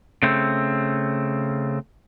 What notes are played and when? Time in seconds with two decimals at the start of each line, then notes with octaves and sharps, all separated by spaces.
0.23 C#3 A3 C4